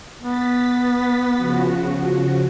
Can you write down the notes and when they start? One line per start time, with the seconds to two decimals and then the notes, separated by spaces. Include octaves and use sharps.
0.21 B3 A6 B6
1.36 C#3 F3 F#4